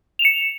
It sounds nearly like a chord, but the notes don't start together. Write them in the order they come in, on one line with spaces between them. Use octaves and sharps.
F7 E7 C#7